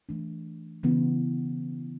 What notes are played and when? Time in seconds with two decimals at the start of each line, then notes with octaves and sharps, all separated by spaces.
0.09 E3 A3 D4
0.83 C#3 E3 B3 E4